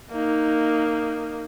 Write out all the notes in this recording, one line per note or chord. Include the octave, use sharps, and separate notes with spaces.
A#3 D#4